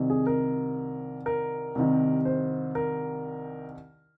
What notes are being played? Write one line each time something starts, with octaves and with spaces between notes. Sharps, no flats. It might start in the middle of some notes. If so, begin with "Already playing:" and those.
Already playing: C2 C3 D#3
G#4
A#4
A#4
C2 C3 D#3
C5
A#4